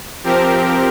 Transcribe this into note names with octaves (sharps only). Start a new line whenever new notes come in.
F3 C4 G4 A#4